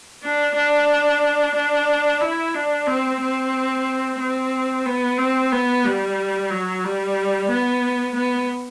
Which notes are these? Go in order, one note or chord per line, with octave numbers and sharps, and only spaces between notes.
D4
D4
D4
E4
D4
C4
C4
C4
B3
C4
B3
G3
F#3
G3
B3
B3